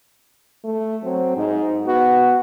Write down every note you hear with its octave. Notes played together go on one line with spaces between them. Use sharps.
A3
F#3 C4
G#2 D#4
B3 F#4